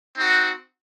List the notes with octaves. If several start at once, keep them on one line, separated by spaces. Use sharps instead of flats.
C4 D#4 F#4